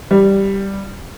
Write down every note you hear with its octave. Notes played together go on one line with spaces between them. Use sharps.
G3